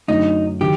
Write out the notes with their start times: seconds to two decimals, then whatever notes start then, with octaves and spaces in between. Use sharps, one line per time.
0.08 F#2 D3 F#3 A3 D#4
0.61 D#3 F#3 G4